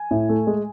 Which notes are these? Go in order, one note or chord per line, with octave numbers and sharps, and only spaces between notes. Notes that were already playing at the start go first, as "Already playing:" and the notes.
Already playing: G#5
A2
A3
G#3